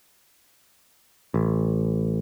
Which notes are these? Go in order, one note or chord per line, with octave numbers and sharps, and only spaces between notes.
A1